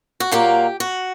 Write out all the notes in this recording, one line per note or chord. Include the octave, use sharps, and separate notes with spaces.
F#4
A#2 F#3 A#3 G4
F#4